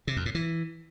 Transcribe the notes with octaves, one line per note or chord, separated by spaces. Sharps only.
C3
F2
A2
E3